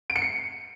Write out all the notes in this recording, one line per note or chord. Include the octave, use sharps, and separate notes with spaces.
D7
C#7
C7